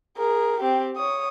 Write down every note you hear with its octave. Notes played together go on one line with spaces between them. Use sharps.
G#4 A#4
C4 G4
C#5 D#6